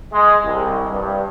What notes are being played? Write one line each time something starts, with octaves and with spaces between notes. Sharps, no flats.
G#3
C2
G2